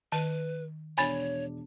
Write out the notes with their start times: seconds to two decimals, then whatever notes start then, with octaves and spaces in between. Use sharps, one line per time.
0.12 D#3 B4 A5
0.98 E1 D4 C#5 G#5 B5 A6